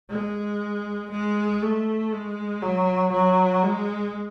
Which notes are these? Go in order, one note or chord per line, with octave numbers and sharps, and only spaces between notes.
G#3
G#3
A3
G#3
F#3
F#3
G#3